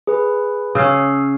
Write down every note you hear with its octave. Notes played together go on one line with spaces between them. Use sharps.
G#4 B4
C#3 C#4 D#6 E6 C7